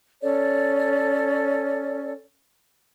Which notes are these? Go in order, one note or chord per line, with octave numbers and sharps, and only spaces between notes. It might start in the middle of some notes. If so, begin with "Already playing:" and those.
C#4 A4 C#5 D5